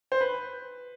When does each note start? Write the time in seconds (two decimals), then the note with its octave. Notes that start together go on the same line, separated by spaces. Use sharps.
0.12 C5
0.21 B4